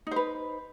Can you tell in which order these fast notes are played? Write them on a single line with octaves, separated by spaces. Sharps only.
D#4 C5 B4